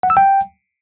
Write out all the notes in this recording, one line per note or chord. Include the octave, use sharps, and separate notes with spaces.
F#5
E6
G5